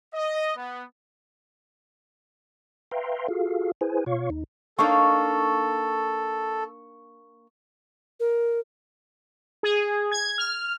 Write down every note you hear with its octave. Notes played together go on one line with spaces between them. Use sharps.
D#5
B3
B4 E5 F5 G5 A#5 C6
F4 F#4 G#4 A4 F5
E4 G#4 B4 C5 G#5
B2 F4 C#5 F5 C#6
D#2 D#4
A#3 D4 D#4 A4 C#6
A#4
G#4
G#6
F6